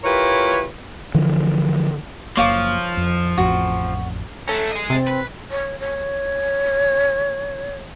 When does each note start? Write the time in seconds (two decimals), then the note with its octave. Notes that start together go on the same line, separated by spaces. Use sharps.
0.04 E4 F4 G4 A#4 B4 C#5
1.14 D3 E3 F3
2.37 F#1 F3 A#3 C#5 F5 D6
2.97 F2
3.38 A1 F2 F#4
4.48 A3 C#4 A4 A#5
4.71 G#4 D#5
4.90 C3 C4 A6
5.07 B4
5.51 C#5
5.80 C#5